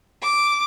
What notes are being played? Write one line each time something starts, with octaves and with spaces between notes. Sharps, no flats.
D6